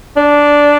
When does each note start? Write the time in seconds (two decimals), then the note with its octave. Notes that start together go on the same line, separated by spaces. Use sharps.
0.17 D4